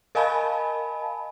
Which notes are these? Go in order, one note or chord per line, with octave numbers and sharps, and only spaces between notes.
A#4 D#5 F5 G#5 A5 B5